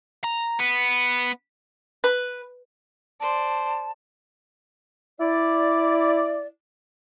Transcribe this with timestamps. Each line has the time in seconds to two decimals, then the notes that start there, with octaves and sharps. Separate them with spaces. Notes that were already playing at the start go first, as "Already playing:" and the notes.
0.24 A#5
0.59 B3
2.04 B4
3.20 C5 D5 A5
5.20 E4 D5